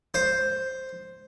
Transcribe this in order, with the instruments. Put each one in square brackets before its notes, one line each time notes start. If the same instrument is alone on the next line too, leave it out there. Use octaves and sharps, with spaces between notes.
[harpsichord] C5